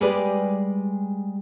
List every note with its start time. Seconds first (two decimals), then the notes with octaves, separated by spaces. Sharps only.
0.01 G3 G#3 G4 G#4 B4 D5